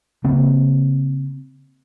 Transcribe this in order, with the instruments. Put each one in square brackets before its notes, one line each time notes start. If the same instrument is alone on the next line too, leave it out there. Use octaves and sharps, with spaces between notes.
[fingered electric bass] C#3 A#3 C4